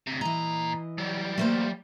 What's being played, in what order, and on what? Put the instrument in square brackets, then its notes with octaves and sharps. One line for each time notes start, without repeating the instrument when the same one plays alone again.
[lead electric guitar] D2 C3
[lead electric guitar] A#2 A#5 [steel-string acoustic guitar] E3 D#5
[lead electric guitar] F#3 G3
[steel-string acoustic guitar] A3 A#3 C5